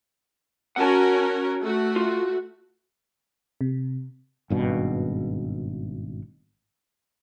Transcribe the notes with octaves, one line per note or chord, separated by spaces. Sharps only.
C#4 F#4 A#4 F#5 A5
A3 F#4
F4
C3
G#1 G2 B2